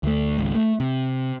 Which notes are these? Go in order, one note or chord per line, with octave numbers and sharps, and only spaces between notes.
D2 A3
G#1 C#2
A3
C3